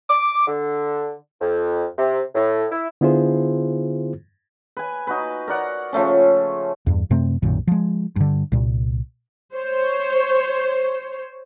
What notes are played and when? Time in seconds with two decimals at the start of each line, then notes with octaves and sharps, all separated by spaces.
0.08 D6
0.47 D3
1.41 F2
1.97 C3
2.35 A2
2.71 E4
3.01 D3 B3 E4 F4 G#4 C5
4.77 B4 G#5
5.07 D#4 F#4 B4
5.48 A#4 D5 F#5
5.93 C#3 F3 A3 C#4
6.87 E2 G2
7.10 F#2 C3 A3 C4
7.42 B1 F#2 A#2 D#3
7.67 F3 G#3
8.16 G2 D3
8.52 C2 A#2
9.54 C5 C#5